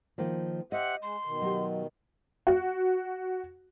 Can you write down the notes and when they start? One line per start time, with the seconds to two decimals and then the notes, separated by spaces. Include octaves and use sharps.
0.18 D#3 F3 A#3
0.72 G4 C5 D#5 E5 F#5
1.02 G#3 C6
1.25 B2 D#3
1.41 F#3 G4
2.47 F#4